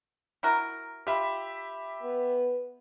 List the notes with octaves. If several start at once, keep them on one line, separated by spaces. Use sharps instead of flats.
E4 F#4 A#4
F4 G4 E5 B5
B3